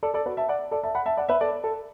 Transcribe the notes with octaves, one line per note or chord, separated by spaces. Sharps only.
A4 D5
A4 D5
F#4 B4
E5 A5
D5 F#5
A4 D5
E5 A5
F#5 B5
E5 A5
D5 F#5
B4 E5
A4 D5
A4